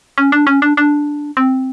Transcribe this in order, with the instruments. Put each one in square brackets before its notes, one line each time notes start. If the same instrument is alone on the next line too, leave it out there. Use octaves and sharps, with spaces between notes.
[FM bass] C#4
D4
C#4
D4
D4
C4